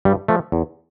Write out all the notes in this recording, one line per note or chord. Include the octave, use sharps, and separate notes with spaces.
G2 G3
F3 A3
E2